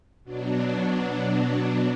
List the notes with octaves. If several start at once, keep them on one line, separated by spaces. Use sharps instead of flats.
B2 F#3 D4